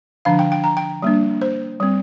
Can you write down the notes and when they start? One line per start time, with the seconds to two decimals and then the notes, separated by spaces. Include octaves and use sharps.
0.25 D3 F3 D4 F5
0.39 G5
0.52 G5
0.64 A#5
0.77 G5
1.03 G3 A#3 D4
1.42 C5
1.80 G3 C4